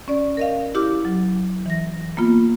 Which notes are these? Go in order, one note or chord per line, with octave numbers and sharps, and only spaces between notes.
C#4 D5
A#4 D#5 F5
E4 G4 D6 F6
F#3
E3 A#6
A#3 B3 F4